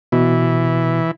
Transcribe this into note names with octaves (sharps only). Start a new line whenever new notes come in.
B2 E3